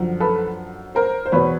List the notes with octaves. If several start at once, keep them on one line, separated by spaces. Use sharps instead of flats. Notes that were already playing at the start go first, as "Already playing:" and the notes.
Already playing: F#2 D3 F3
A4 B4
A#4 C5
C5
E2 B2 B4 C#5